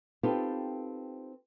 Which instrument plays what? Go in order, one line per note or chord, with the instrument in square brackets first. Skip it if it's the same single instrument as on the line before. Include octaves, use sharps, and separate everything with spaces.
[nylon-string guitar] C4 D#4 F4 G4 A4 B4